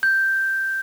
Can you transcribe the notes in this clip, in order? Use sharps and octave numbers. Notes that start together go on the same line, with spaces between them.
G6